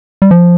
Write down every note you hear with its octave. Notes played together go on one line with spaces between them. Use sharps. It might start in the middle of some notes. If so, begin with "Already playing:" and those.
G3
F3